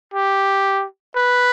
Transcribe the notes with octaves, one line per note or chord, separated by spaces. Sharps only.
G4
B4